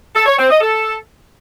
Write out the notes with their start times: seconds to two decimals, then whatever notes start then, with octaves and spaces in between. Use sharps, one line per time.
0.15 A4
0.26 C#5
0.38 C4
0.49 D#5
0.61 A4